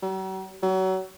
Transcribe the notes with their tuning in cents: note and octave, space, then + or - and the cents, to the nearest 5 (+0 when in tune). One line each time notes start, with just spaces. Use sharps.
F#3 +45
F#3 +30